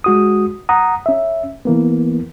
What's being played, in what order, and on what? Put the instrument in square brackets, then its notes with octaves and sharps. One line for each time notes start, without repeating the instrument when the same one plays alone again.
[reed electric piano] G#3 F#4 D#6
F#5 A#5 D#6
C#4 E5
E3 A#3 B3